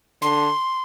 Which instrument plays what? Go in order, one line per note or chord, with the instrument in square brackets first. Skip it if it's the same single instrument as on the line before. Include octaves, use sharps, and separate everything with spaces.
[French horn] D3 [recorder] C6